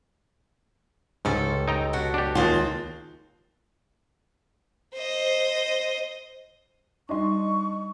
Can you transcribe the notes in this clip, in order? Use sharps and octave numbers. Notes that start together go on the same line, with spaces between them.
C#2 G#2 C#4 E4 G4 A4 C6
D#4 G5 A#5 E6
B2 F#4 A5
B3 D4 G4
D#2 F4 F#4 G#4 C5
C5 D#5
G3 D4 D#4 D#5 C6 C#6